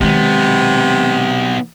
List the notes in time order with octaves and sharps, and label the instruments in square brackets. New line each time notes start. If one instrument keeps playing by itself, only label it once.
[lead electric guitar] B1 B3 [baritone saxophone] C3 [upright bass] D#3 G#3